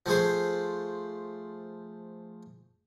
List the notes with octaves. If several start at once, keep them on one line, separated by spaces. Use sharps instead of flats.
F3 A3 G#4 C5